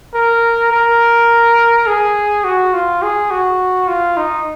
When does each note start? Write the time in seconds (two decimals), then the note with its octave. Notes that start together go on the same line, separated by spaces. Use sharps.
0.14 A#4
0.72 A#4
1.87 G#4
2.44 F#4
2.74 F4
3.02 G#4
3.31 F#4
3.88 F4
4.17 D#4